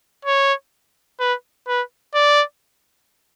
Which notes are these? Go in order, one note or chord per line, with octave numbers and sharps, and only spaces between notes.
C#5
B4
B4
D5